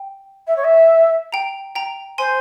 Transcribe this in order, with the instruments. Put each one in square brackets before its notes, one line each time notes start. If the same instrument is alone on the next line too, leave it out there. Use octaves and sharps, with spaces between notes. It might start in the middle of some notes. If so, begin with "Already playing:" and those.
Already playing: [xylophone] G5
[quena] E5
C#5
E5
[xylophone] G5 A#5
G5 A#5
[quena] C5 [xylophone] G#5 C6